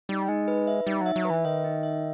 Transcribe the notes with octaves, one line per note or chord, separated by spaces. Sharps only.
G3 D#4
G#3 D#4
B4
E5
G3 D#4
F#3 E5
F#3
B4
E3
D#3 E5
D#4
E5